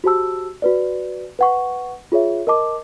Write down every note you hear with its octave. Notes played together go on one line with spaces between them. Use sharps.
F#4 G4 C5 A5 E6
F#4 B4 D5
B4 F#5 C#6
F4 G#4 C#5 E5
A#4 D#5 A5 D6